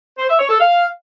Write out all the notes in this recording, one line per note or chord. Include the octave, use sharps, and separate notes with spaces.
C5
E5
C#5
A4
F5